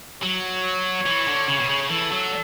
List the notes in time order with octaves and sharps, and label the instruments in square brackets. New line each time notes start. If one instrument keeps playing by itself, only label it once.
[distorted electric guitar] F#3 [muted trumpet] C#5
[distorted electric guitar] E3
D3
C#3
B2
C#3
[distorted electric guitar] E3 [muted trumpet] A4
[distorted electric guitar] F#3